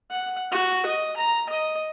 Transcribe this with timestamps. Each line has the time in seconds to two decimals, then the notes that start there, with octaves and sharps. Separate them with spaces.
0.11 F#5
0.51 F#4
0.86 D#5
1.17 A#5
1.49 D#5